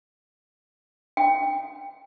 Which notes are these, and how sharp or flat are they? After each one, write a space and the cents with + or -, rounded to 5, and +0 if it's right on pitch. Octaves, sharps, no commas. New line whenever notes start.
G5 +20